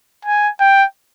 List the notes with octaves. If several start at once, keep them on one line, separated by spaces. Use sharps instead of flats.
G#5
G5